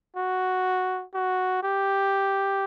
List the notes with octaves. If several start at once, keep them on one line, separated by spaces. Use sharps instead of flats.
F#4
F#4
G4